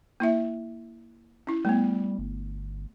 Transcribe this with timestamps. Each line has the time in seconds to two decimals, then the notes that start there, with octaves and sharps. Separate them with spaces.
0.20 A#3 E4 E5
1.47 C#4 E4
1.65 G3 A3 B3
2.19 G1